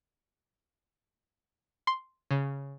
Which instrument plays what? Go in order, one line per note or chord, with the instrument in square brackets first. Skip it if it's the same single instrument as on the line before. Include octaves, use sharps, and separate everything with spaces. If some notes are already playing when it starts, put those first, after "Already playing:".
[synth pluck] C6
C#3